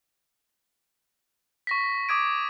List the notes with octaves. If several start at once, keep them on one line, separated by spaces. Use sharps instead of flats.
C#6 A#6 B6
D6 D#6 G#6 D7